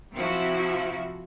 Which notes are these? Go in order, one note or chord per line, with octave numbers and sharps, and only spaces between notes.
C3 F3 E4 F#4